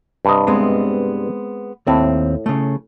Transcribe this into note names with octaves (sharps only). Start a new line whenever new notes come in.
G2 C3 D#5
G#3 B3 C4
D#2 A2 C4
C#3 A3